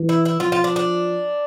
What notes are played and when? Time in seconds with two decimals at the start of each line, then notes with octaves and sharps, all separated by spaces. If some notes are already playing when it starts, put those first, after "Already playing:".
Already playing: E3
0.09 E4
0.25 E4
0.40 F3 F4
0.52 F4
0.64 D4
0.76 D4